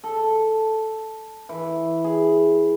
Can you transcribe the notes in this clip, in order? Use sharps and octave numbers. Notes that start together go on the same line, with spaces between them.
A4
E3
G#4